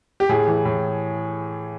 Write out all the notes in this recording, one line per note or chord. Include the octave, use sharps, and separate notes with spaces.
G4
A2 G#4
E3
A2